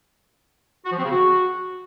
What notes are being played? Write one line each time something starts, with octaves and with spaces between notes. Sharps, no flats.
F#4
F3
C4
C#3
F#4